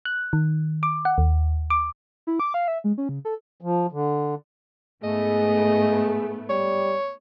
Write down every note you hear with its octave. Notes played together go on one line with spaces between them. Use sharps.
F#6
D#3
D6
F#5
D#2
D6
E4
D6
F5
E5
G#3
C#4
C#3
A4
F3
D3
G#2 A3 B3 G#4 D#5
G3 C#5